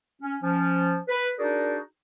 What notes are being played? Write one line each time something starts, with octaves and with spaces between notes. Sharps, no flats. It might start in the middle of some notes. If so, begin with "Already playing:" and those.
C#4
F3 C#4
B4
D4 D#4 F#4 G#4 A#4 D5